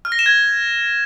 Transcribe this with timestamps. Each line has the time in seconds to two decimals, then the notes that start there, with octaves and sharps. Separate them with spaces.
0.05 F6
0.12 A#6
0.19 E7
0.26 G#6